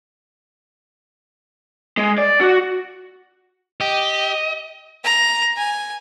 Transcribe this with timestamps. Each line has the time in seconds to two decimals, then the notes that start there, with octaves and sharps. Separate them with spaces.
1.97 G#3
2.18 D5
2.41 F#4
3.81 G4 D#5
5.04 A#5
5.57 G#5